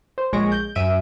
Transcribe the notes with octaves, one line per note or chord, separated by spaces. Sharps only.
C5
A#1 G#3 C#5 C#6 A#6 D7
G6
F#2 E5 D7 D#7